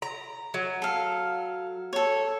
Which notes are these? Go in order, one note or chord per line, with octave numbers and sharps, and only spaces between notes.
A#5
F#3
A4 F5
A4 C#5